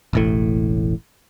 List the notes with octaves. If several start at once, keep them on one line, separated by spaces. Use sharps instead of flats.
E1 A1 A2